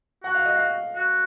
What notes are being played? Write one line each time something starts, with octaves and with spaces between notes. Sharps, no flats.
F#4 F#5
F5
D#5
F5
F#4